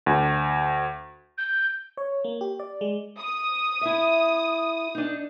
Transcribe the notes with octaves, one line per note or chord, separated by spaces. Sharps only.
D2
G6
C#5
A#3
G4
D5
G#3
D#6
E4 E5
D4 D#4